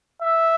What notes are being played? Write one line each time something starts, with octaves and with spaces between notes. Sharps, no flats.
E5